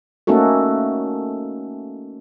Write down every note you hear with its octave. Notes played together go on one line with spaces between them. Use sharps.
A3 A#3 C#4 D#4 F#4 A4